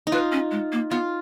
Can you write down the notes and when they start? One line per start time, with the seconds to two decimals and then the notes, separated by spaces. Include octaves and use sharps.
0.07 D#4
0.12 F4 B4
0.32 C#4
0.51 G#3
0.72 A#3
0.91 B3 F4